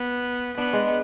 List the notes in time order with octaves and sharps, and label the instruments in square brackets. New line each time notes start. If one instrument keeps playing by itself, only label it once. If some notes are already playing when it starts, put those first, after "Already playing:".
Already playing: [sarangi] B3
[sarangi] B3 [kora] D4
[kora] G#3